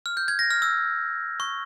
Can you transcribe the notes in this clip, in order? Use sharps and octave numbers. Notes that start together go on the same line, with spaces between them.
F6
G6
G#6
A#6
F6
E6
C#6